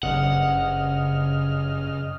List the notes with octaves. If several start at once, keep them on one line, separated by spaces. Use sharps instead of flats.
F#1 G2 C#3 D#5 F#5 F6